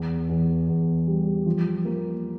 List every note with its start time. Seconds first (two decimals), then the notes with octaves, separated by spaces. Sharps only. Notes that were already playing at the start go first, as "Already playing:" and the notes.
Already playing: E2
0.29 E2
0.69 E2
1.07 G3
1.46 F3
1.85 A#3